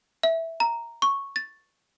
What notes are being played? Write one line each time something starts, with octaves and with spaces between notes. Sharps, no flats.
E5
A#5
C#6
A6